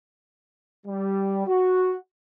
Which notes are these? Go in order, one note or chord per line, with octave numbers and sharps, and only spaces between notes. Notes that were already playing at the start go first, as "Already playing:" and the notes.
G3
F#4